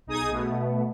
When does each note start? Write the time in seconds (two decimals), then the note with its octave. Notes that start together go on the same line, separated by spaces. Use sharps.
0.06 B1 D#4 G#4 D#6 G#6
0.30 B2 A3 B3